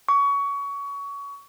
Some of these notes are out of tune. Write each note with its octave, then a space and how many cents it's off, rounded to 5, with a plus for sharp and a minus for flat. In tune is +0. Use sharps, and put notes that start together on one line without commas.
C#6 +25